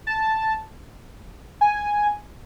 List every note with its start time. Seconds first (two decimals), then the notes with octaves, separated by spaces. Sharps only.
0.07 A5
1.61 G#5